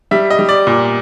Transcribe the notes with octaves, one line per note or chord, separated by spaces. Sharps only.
G3 E5
D#5
G3
D5
A#2